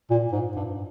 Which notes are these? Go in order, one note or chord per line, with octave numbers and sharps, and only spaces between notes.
A#2
G#2
G2